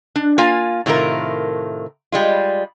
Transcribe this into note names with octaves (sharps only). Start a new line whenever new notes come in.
D4
A#3 F4 F5 G#5
A2 C3 D#3 A3 F4 A#4
G3 G#3 F4